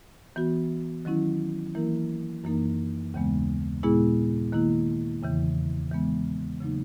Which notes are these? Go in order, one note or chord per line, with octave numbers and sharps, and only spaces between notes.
E3 B3 F#4
D#3 F#3 C#4 E4
E3 A#3 E4 A#4
F#2 E3 A#3 D#4 A#4
D#2 C#3 E3 G#3 B3
A#2 G#3 B3 E4 G#4
D#3 A#3 E4
E2 C#3 E3
E3 G#3 B3
C#3 F#3 A#3 D#4